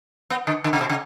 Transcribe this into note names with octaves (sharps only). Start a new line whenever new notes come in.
B3
D3
D3
C#3
B2
C#3